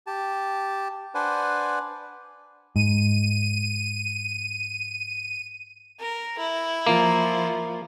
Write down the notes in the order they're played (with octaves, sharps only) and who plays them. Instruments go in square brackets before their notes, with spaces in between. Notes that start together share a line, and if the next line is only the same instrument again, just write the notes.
[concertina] G4 A5
D4 B4 C5 D5 F#5 G#5
[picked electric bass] G#2 [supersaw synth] D#7
[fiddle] A#4
E4
[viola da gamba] F3 F4 [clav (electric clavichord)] A#3